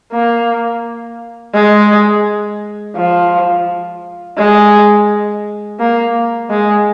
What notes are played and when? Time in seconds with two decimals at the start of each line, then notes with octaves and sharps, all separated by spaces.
0.12 A#3
1.54 G#3
2.96 F3
4.38 G#3
5.80 A#3
6.50 G#3